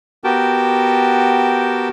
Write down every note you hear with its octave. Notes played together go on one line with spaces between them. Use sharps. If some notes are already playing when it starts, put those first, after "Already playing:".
B3 F#4 G4 A#4 G5 A5